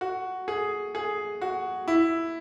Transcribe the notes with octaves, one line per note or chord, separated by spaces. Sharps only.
F#4
G#4
G#4
F#4
E4